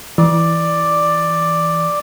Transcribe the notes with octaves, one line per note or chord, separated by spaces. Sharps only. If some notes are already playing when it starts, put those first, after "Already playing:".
E3 D5